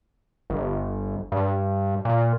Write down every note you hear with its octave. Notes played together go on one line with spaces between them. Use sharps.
G1
G2
A#2